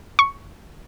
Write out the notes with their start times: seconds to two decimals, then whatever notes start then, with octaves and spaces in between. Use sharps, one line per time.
0.19 C#6